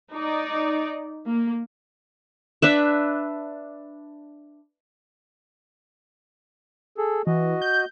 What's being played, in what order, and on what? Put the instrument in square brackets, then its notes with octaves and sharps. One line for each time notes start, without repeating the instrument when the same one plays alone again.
[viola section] D#4 D5
A#3
[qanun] D4 B4 E5
[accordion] G#4 A4
[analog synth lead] E3 [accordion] F#4 D#5
[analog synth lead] G6